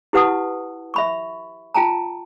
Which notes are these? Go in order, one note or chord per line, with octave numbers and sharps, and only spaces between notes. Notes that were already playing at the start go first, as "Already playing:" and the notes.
E4 G4 B4 F#5 A5 D#6
E5 B5 C#6
F4 G5 A5 A#5